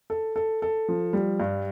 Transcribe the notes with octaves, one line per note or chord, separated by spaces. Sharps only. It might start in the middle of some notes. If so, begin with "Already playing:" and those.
A4
A4
A4
F3
G3
G2